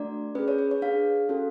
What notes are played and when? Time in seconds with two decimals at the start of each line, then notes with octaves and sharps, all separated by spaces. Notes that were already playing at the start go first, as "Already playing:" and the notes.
Already playing: A3 D4 F#4 D5
0.35 C#4 G#4 B4
0.48 C#5
0.58 B4
0.71 C#5
0.82 D4 G#4 F5
1.29 C#4 F#4 A4